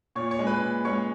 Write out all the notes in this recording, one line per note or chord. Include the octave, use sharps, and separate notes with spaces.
A#2 C#5 C#6
C#5 C#6
G#3 C#4
B4 B5
A#2
G#3 C#4 C#5 C#6